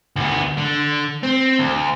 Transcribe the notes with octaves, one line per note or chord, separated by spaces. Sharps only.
D2 B3
D3
C4
D2